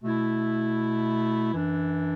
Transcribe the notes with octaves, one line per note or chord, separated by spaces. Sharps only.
B2 A3 E4
F#2 E3 D4